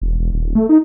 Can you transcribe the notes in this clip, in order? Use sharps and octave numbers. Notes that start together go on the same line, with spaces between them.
E1
E1
D#1
A3
D#4